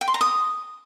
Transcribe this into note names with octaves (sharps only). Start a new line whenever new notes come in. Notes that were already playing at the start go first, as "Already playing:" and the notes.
G5
C6
A#5
D#6